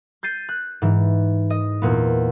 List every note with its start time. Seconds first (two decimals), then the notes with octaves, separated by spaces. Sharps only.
0.23 G6 A6 C7 D#7
0.49 F#6
0.82 G#2 E3
1.50 D#5
1.82 E2 A#2 B3